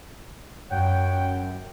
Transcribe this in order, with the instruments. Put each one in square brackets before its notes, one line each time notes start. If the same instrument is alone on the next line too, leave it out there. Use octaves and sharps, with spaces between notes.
[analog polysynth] F#2 [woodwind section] C#5 F#5 G5